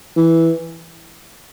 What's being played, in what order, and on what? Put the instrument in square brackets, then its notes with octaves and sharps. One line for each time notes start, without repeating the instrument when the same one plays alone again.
[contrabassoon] E3